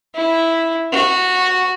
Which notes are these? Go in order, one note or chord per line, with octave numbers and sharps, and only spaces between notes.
E4
F#4